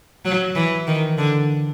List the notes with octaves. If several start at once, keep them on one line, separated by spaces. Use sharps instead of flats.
F#3
E3
D#3
D3